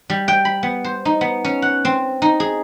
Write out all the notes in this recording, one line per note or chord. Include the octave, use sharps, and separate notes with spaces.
G3
G5
B5
B3
C5
D#4
B3
C#4
F#5
C4
D#4
G#4